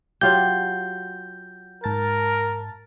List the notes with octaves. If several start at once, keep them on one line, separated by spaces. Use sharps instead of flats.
F#3 F4 G4 G6
G#2 A#4 A5 A6